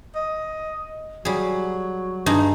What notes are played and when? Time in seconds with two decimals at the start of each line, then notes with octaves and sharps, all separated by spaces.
0.15 D#5
1.25 F#3 G3 G#4
2.26 G2 D#4 G#4